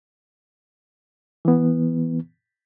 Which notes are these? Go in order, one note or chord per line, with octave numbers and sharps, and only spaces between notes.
E3 B3